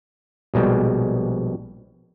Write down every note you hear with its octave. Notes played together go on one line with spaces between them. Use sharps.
A#1 B2 G3 G#3